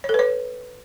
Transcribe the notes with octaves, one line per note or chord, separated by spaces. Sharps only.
C#5
A4
B4
C#5